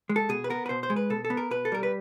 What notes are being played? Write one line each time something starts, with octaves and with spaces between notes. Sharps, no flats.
G#3
A4
B2 G#4
B4
B3 A#4
B4
B2 C5
C5
G#3
B4
B2 A4
A4
B3
A#4
B2 B4
A4
G3 A#4
B4